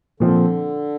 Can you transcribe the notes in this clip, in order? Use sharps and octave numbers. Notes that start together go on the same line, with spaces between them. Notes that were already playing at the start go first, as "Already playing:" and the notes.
A#2 D3 F3 C4